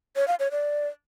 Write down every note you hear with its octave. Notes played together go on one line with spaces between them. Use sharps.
C#5
F5
C#5
D5